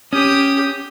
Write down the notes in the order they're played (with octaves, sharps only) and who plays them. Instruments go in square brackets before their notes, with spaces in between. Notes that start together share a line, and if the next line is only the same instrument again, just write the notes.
[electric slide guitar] C#4 [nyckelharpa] G4 D#6